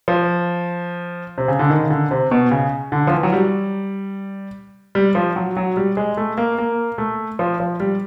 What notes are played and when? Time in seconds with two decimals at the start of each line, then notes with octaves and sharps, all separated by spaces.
0.08 F3
1.38 C3
1.48 C#3
1.59 D3
1.70 D#3
1.83 C#3
1.90 D3
2.11 C3
2.31 B2
2.51 C#3
2.92 D3
3.07 F3
3.13 E3
3.23 F#3
3.33 G3
4.95 G3
5.15 F3
5.36 F#3
5.57 F#3
5.77 G3
5.97 G#3
6.17 A3
6.38 A#3
6.58 A#3
6.98 A3
7.39 F3
7.60 F3
7.80 G3